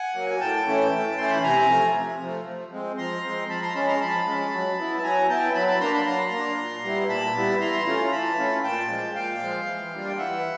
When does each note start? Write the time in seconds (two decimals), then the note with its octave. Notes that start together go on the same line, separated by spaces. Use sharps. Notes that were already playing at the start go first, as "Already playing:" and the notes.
Already playing: F#5 G#5
0.15 F#3 A#3
0.30 G#5
0.40 A2 G5 A5
0.67 E3 A3 C#4 E4
0.91 A2
1.17 E3 A3 C#4 E4 C6
1.30 B5
1.43 C3 G#5 A#5
1.69 F3 A3
1.95 C3
2.20 F3 A3
2.46 F3
2.72 G#3 C4
2.98 F3 A#5 C6
3.24 G#3 C4
3.49 F3 A5 B5
3.62 A#5 C6
3.75 G#3 C#4 A5 B5
3.88 A#5 C6
4.00 F3 A5 B5
4.26 G#3 C#4
4.52 F#3
4.78 B3 E4
4.97 A5
5.03 F#3 G#5 A#5
5.29 B3 E4 G5 A5
5.55 F#3 A5 B5
5.68 A5 B5
5.81 A#3 D4 A#5 C6
5.94 A5 B5
6.06 F#3 A#5 C6
6.32 A#3 D4
6.58 A#2
6.84 G3 B3 E4
7.09 A#2 A5 B5
7.35 G3 B3 E4
7.60 E3 A#5 C6
7.87 A3 C#4 F4
8.05 A#5
8.12 E3 A5 B5
8.38 A3 C#4 F4
8.64 A#2 G5 A5
8.90 F3 G#3
9.15 A#2 F5 G5
9.40 F3 G#3
9.67 E3
9.92 G3 A#3 D4 F4
10.07 G5
10.17 E3 E5 F#5